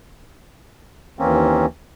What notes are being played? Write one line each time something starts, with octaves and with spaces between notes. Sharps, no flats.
D#2 E3 A#3 C4 C#4